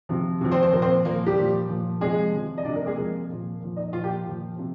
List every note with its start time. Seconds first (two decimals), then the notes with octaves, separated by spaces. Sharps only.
0.09 C3 F3
0.41 C3 F3
0.52 C4 C5
0.63 C5
0.72 A#2 F3 A#4
0.82 C4 C5
1.05 A#2 F3 A#3 A#4
1.26 G3 G4
1.36 A#2
1.42 F3
1.69 A#2 F3
2.01 C3 F3 G#3 G#4
2.33 C3 F3
2.58 D#5
2.64 C3 F3 D4 D5
2.75 A#3 A#4
2.86 G#3 G#4
2.96 C3 F3 A#3 A#4
3.29 A#2 F3
3.61 A#2 F3
3.76 D#4 D#5
3.92 A#2 F4 F5
3.98 F3
4.04 G4 G5
4.25 A#2 F3
4.57 C3 F3